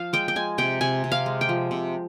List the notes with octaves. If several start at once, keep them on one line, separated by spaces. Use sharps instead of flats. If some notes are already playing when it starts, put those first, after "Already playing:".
Already playing: F3 F5
G#3 G5
G5
G#3 G#5
C3 G5
C3 G#5
C3
F5
G#3
G5
F3
C3